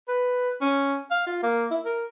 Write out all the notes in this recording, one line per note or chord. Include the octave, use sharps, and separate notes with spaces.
B4
C#4
F5
F4
A#3
E4
A#4